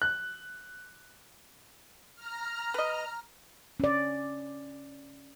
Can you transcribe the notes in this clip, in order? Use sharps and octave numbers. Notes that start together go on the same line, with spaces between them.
F#6
A#5 F6
B4 D#5
C#4 D5